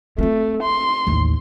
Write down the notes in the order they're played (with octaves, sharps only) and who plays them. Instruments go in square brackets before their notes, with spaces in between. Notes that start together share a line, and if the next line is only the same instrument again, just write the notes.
[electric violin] A3 [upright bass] C4 F4
[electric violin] C6
[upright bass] A1 D#2